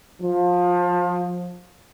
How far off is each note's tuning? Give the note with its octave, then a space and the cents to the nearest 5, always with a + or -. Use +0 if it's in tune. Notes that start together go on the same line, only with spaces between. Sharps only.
F3 +25